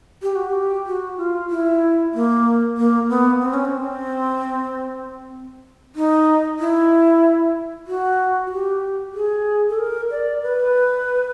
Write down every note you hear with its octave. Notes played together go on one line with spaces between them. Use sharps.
G4
F#4
G4
F#4
F4
E4
A#3
A#3
B3
C4
C#4
C4
D#4
E4
F#4
F#4
G4
G#4
A4
A#4
D5
B4